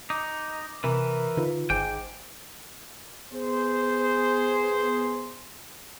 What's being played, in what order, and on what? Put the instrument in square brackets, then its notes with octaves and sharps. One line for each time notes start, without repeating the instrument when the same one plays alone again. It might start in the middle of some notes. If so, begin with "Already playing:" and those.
[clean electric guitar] D#4 [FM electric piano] D6
[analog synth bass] C3 [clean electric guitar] E3 [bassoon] A#4
[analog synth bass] D3 [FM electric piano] D#4 F4 B4
[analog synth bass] G#1 [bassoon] G#2 [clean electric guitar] G5 [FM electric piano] G#5 D6
[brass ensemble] B3 G#4 C5